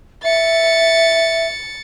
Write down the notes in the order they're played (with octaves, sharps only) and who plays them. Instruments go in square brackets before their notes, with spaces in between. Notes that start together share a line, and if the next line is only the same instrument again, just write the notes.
[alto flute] E5 [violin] A6 C#7